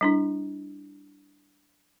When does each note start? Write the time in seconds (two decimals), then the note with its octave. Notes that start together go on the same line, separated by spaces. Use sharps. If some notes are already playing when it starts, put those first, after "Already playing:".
0.01 G3 D4 E4